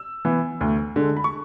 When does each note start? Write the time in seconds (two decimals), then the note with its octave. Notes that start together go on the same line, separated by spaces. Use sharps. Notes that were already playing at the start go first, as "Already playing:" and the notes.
Already playing: E6
0.25 E3 B3
0.61 D2
0.96 D3 G#3
1.17 B5
1.24 C#6